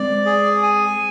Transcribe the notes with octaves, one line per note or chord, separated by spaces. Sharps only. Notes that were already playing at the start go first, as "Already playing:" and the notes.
Already playing: G#3 C4 D5
G#4
G#5